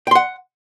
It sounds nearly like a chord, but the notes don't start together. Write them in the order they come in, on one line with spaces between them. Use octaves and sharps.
G5 C6 F#5